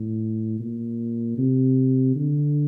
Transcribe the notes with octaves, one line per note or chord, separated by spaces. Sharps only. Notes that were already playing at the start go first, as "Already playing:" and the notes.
Already playing: A2
A#2
C3
D3